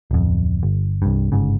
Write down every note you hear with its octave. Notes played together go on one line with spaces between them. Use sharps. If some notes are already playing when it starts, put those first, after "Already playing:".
D1 F2
G1
C2 G2
G1 G#2 C#3